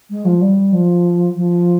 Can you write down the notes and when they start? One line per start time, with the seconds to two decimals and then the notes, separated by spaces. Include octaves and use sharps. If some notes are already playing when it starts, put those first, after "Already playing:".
0.10 G#3
0.25 F3
0.41 G3
0.73 F3
1.36 F3